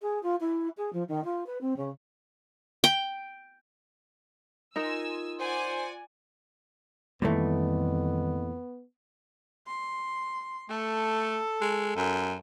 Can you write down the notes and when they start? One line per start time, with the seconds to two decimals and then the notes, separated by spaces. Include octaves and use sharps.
0.01 G#4
0.23 F4
0.40 E4
0.77 G#4
0.92 F3
1.08 D#3
1.24 F4
1.46 B4
1.61 C4
1.76 C#3
2.84 G5
4.76 D#4 F4 A#4 G#5 E6
5.40 C5 D5 F#5 G#5
7.22 F2 A#2 D#3 E3 G3 A3 B3
9.67 C6
10.69 A3 A4
11.61 G#3
11.96 F#2